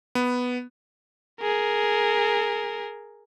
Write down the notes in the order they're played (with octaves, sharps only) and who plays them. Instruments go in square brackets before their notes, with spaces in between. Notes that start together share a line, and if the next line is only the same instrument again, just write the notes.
[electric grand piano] B3
[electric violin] G#4 A#4